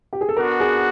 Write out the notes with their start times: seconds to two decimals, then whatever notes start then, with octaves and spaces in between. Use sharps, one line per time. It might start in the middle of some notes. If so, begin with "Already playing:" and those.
0.13 G4
0.21 G#4
0.29 A4
0.37 B3 D4 F#4 A#4
0.60 G#4